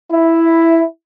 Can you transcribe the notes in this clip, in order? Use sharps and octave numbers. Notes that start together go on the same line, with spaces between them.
E4